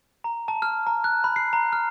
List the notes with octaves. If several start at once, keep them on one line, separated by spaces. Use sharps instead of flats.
A#5
A5
F6
A#5
F#6
B5
C7
A#5
F6